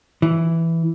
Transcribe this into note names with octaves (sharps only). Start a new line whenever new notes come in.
E3